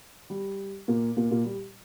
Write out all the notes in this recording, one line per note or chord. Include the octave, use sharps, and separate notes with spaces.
G3
A#2 A#3
A#2 A#3
A#2 A#3
G3